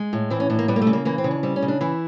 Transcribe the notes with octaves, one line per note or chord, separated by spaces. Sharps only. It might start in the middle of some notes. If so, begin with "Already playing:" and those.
Already playing: G#3
A2
E3 C4
C#4
A2 D4
A#3
G3 B3
A#3
A3
C#3
A#3
E3 A#3
C4
C#3
D4
G3 C4
C#4
C#3
D4
E3 E4